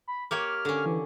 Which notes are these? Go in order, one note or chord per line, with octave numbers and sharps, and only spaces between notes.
B5
A#3 G4 C#5 F6
D3 C#4
E3